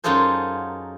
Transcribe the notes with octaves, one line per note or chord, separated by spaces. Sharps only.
F#2 D#4 F4 G#4 A4 C5